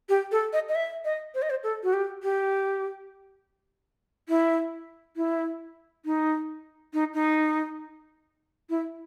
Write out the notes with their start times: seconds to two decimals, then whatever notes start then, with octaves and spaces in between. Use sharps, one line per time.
0.09 G4
0.32 A4
0.53 D#5
0.69 D#5
0.75 E5
1.05 D#5
1.35 C5
1.42 D#5
1.50 C5
1.64 A4
1.83 F#4
1.93 G4
2.23 G4
4.29 E4
5.16 E4
6.05 D#4
6.94 D#4
7.14 D#4
8.70 E4